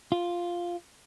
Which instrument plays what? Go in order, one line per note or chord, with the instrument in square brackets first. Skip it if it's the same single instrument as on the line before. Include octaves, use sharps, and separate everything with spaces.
[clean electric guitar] F4